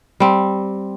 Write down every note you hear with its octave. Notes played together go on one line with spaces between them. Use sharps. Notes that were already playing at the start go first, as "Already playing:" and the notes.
G3 C4